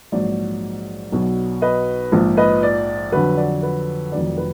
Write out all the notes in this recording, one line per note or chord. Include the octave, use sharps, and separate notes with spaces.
A#1 G#2 F#3 D5
B1 B2 F#3
B4 D#5
A#1 G#2 F3
B4 D#5
D5
F2 D3 F#3 B4
D5
B4
F1 F2 D#3 F#3 D5
B4